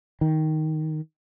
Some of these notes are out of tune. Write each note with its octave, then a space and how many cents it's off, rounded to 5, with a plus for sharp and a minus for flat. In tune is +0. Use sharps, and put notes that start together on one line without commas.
D#3 +5